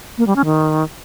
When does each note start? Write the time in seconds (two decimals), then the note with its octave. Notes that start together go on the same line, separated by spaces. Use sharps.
0.18 A#3
0.27 G3
0.36 C#4
0.45 D#3